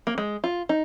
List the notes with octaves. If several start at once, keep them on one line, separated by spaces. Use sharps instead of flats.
A#3
G#3
F4
D#4